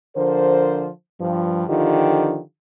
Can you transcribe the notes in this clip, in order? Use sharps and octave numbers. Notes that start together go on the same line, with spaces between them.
D3 F3 A#4 C5
G2 F3
D3 D#3 F3 D#4 F4 G4